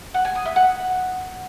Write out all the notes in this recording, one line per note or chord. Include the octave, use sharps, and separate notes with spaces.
F#5
G#5
D#6
E5
F#5